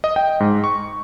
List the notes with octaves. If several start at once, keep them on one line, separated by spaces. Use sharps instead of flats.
D#5
G5
G#2
C#6